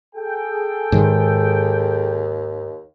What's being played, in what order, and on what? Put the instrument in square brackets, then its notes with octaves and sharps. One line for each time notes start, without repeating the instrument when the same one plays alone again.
[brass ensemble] G#4 A4 G5
[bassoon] D#2 [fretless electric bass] G#2 D#3